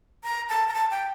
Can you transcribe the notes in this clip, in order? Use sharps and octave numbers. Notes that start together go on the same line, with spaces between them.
A#5
A5
A#5
A5
G5